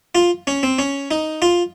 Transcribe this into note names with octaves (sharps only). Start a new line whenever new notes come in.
F4
C#4
C4
C#4
D#4
F4